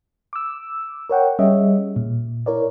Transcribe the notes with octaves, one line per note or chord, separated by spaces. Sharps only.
D6 E6
A#4 C#5 F#5 G5
G3 C#4 G#4 C#5 D#5 E5
A#2
E4 A#4 C#5 D5